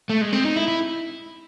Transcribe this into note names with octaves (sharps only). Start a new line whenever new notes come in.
A3
G#3
C4
D#4
E4
E4